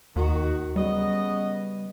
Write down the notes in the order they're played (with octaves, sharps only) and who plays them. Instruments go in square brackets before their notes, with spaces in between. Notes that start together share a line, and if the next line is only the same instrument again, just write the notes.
[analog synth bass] D#2 [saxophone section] D#3 F#4
[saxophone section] C#3 B3 D#5 [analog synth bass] G3